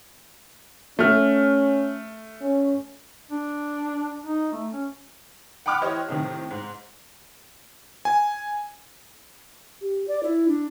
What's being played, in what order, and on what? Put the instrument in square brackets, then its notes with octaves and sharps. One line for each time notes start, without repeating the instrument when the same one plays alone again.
[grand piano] A3 F6 [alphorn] C#4
[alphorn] C#4
[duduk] D4
D#4
A3
C#4
[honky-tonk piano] F#5 G5 B5 D6 F6 F#6
E3 G4 C5 C#5 D#5
A2 C3 D#3
G#2
[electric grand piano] G#5
[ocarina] G4
D5
E4
D4